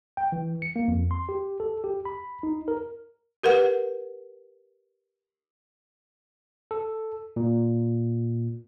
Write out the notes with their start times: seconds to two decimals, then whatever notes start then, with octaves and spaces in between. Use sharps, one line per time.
0.17 G5
0.32 E3
0.62 C#7
0.76 A#3
0.88 F2
1.11 C6
1.29 G4
1.60 A4
1.84 G4
2.05 B5
2.43 D#4
2.68 A#4
3.43 G4 A#4 B4 F#5
6.71 A4
7.36 A#2